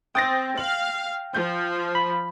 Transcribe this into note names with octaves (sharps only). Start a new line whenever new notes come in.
C4 G5 D#6 A6 A#6
F5 F#7
F3 G6
B5